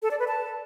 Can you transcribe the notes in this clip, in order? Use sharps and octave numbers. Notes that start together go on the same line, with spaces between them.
A4
D5
B4
A5